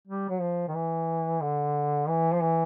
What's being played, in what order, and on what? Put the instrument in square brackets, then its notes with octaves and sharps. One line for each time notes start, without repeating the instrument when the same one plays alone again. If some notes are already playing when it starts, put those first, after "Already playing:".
[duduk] G3
F#3
F3
D#3
E3
D3
E3
F3
E3